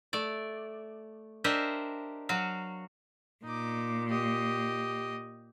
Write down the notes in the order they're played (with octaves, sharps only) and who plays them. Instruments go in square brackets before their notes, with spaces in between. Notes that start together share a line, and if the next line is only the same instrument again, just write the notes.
[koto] A3 D5
D4 G4 A#4 C5 D#5 E5
F#3 F#4 F5
[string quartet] A#2 [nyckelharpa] D#4 D6
[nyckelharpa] G4 D#5